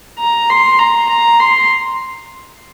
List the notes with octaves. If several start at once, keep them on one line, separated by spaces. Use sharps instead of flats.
A#5
C6
A#5
A#5
C6